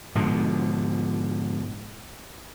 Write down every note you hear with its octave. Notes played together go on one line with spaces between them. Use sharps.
G#2 B2 D3 F3